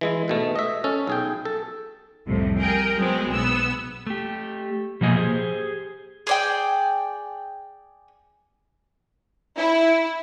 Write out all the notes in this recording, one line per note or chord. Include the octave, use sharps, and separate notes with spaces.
E3 G#3 E4
G#2 B2 A3
D#5 E5
C#4 A4
B1 G#4 G5
A4
C2 F2 A2 C3
G#4 A#4 G5
F#3 G#3 B3 C4
B1 B3 E6
A3 G4
B2 F3 A#3 D#5 G#5
G4 G#4 C5
G#4 D5 G5
E4